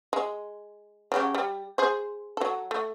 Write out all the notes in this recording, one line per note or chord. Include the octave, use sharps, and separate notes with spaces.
G#3
C#3 F#3 G4
G3
G#4 C5
F#3 A4
A3